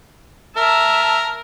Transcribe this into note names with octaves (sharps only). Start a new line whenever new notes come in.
A#4 E5 A5